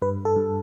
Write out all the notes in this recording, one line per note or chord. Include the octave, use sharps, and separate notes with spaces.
G2 B4
A4
G2